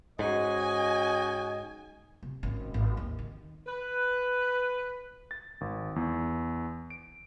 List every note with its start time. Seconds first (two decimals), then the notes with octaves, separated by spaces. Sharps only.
0.19 G#2 C#4 F#4 D#5 G#5
2.23 C3
2.43 G#1 C#4
2.74 G#1
2.97 D#2
3.19 D#3
3.66 B4
5.31 A6
5.61 G#1
5.96 E2
6.90 D7